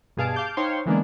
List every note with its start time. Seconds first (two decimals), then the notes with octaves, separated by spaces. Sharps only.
0.17 G2 B2 G#4 F5 A5 D7
0.36 F5 A5 D6 G6
0.57 D#4 C5 C#5 F5 G5 C6
0.86 D3 E3 G#3 A#3 B3 D4